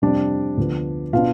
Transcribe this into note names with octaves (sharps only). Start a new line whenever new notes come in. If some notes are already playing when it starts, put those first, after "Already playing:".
F2 C3 G3 C4 D4 D5
D2 D3 F3 B3
B2 B3 D4 F4 F5